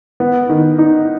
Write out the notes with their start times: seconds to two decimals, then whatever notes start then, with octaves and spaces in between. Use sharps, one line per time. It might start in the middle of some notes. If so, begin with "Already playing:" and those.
0.20 B3
0.50 D#3
0.78 D#4